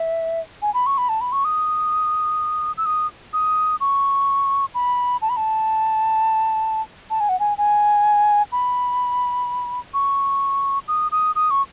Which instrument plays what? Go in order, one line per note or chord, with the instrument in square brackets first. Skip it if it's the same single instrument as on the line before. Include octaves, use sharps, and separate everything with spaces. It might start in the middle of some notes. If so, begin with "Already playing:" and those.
Already playing: [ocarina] E5
G#5
B5
C#6
B5
A5
B5
C#6
D#6
E6
D#6
D#6
C#6
B5
A5
B5
A5
A5
G#5
F#5
G#5
G#5
B5
C#6
D#6
D#6
D#6
C#6